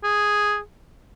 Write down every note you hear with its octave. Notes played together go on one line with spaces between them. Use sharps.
G#4